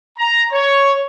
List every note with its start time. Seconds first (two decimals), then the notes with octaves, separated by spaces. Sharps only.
0.18 A#5
0.52 C#5